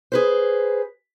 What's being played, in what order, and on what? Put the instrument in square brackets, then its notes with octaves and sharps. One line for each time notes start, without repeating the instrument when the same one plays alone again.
[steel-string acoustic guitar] G#4 B4 C5